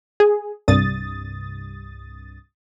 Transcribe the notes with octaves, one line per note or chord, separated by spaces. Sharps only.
G#4
C2 G2 D#6 A6